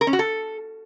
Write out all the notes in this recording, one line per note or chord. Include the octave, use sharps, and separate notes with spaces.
A#4
C#4
F#4
A4